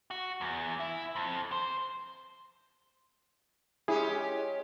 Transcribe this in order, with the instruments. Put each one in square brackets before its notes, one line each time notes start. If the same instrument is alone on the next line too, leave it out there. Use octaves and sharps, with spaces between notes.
[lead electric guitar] F#4
E2
E4
F2
C5
[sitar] G#3 C#4 G4 [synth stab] E4 G#4